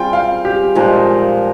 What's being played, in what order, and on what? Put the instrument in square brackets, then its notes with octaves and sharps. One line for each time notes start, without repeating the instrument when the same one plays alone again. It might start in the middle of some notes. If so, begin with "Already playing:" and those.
Already playing: [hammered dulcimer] G3 C4 F4 G#4 [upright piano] G5
[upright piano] F5
G4
[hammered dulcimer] A#2 F3 A#3 D#4 [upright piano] G#3